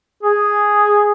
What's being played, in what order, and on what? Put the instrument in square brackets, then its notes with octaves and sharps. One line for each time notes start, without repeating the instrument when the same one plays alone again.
[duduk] G#4